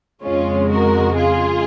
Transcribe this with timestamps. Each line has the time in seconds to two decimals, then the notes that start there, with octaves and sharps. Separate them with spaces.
0.23 F2 C#3 G#3 C#4 F4
0.70 F#4 A#4
1.17 F4 G#4